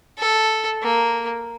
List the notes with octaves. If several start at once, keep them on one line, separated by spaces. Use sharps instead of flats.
A4
A#3